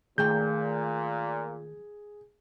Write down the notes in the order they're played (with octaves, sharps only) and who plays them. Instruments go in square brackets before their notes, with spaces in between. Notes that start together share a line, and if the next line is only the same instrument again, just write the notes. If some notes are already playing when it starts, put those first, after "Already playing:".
[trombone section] A#2 [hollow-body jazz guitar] D#3 A3 G5 [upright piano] G#4 [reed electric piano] G6